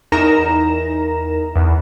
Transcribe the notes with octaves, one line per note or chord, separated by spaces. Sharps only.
E2 D#4 A#4 A#5 A#6 E7
E2